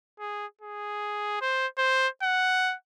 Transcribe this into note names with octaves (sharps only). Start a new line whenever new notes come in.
G#4
G#4
C5
C5
F#5